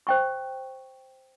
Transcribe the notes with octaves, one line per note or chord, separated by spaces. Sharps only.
C5 G5 C#6